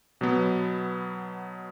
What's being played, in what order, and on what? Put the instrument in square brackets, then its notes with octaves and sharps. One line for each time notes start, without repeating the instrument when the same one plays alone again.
[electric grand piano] B2 F#3 B3